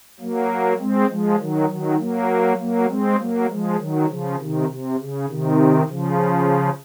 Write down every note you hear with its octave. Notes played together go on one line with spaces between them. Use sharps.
F#3 A#3
G#3 C4
F3 G#3
D#3 F#3
D#3 F#3
F#3 A#3
F#3 A#3
G#3 C4
F#3 A#3
F3 G#3
D#3 F#3
C#3 F3
C3 D#3
C3
C#3
C3 D#3
C#3 F3